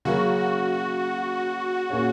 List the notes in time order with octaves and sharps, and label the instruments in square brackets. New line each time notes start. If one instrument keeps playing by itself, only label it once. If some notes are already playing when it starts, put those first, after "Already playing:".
[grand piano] C#3 F#3 A#3 C#4 A#4 [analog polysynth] F#4
[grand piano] A#2 A#3 C#4 G#4 C#5